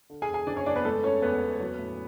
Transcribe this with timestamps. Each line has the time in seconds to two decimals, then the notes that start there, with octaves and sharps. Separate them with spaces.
0.10 D3
0.22 G#4 G#5
0.28 E2
0.34 G#4 G#5
0.47 F#1 D4 D5
0.56 C#4 C#5
0.66 F#1 D4 D5
0.75 B3 B4
0.84 G#3 A3 A4
1.03 C#3 C#4 C#5
1.22 E2 B3 B4
1.41 E2
1.60 F#3
1.79 A2